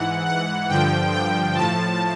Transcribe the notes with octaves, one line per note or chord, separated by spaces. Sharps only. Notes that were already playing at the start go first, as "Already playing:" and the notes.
Already playing: G#2 E3 F#5
F#5
G2 D3 F3 G5
G5
A2 F3 A5